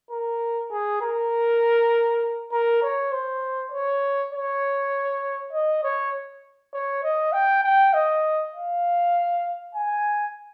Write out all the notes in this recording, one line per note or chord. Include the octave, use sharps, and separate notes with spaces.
A#4
G#4
A#4
A#4
C#5
C5
C#5
C#5
D#5
C#5
C#5
D#5
G5
G5
D#5
F5
G#5